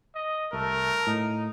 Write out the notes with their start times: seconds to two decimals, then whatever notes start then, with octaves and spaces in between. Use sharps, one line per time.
0.15 D#5
0.53 C2 A3 A#4
1.07 A2 D#4